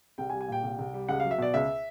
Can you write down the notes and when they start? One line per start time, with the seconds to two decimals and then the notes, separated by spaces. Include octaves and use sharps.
0.18 C2 G5
0.30 G#5
0.33 G3
0.41 G#5
0.48 A#2 G5
0.63 C2
0.79 C2
0.94 G3
1.09 C#2 F#5
1.20 F#3 F5
1.31 E5
1.38 B2 D5
1.54 C#2 E5